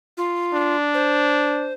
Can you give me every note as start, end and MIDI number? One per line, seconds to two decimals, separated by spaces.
0.17 0.75 65
0.54 1.74 62
0.94 1.73 72